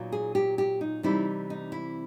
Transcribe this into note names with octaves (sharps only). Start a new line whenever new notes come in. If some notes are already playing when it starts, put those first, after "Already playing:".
Already playing: A#2 F#3 B3 D#4
G#4
G4
G4
D#4
C3 E3 G3 C4 D#4 E4
D#4
E4